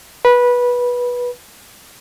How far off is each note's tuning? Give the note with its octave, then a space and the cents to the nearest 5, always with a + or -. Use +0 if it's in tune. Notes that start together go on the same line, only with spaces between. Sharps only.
B4 -15